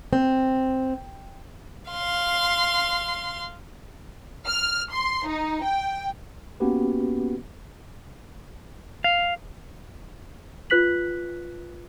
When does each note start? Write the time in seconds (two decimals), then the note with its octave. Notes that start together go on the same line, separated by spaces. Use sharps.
0.13 C4
1.91 F5 C6
4.48 F6
4.93 C6
5.28 D#4
5.64 G5
6.60 A#3 B3 C#4 F#4 G4 B4
9.04 F5
10.70 F4 B4 F#6 B6 F#7